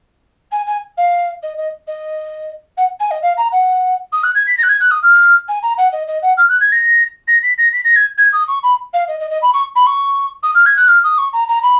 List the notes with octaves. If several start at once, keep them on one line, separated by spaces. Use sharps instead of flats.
G#5
G#5
F5
D#5
D#5
D#5
F#5
G#5
D#5
F5
A#5
F#5
D#6
F#6
G#6
B6
A#6
F#6
G#6
F#6
D#6
F6
G#5
A#5
F#5
D#5
D#5
F#5
F6
F#6
G#6
A#6
A#6
B6
A#6
B6
A#6
G#6
G#6
D#6
C#6
B5
F5
D#5
D#5
D#5
B5
C#6
B5
C#6
D#6
F6
G#6
F#6
F6
D#6
C#6
A#5
A#5
B5